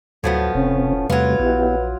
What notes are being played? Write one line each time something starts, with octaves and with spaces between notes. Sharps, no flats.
D2 A2 F3 F#3 B3
E1 C3 C4 C#4
E2 C3 F#3 G3 A3 F4 B4
A#1 B3 E4 G4